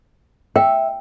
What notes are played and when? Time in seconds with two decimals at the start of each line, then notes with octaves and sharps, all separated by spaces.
0.56 E5 G5